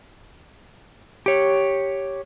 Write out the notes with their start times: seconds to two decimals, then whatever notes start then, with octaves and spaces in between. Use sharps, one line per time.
1.26 G4 C#5